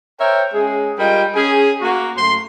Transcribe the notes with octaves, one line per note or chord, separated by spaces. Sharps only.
A#4 C5 C#5 E5 G5
G#3 C#4 G#4
G3 F4 A#4 D#5 G5
C#4 G#4
A#3 F#4
F#2 A3 C6